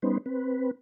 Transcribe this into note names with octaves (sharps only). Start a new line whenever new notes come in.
G3 B3 C#4 D#4 B4 C5
C4 B4